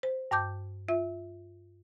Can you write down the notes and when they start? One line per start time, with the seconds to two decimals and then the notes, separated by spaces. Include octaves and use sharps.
0.03 C5
0.31 G2 A5 D6 G6
0.88 F4 E5